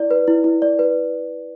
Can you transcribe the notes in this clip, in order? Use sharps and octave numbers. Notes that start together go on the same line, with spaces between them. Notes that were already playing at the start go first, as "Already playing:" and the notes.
Already playing: E4 D5
B4
E4
E4
D5
B4